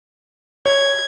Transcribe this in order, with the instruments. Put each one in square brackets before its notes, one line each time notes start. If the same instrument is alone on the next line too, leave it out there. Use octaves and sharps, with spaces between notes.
[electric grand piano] C#5 [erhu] G#6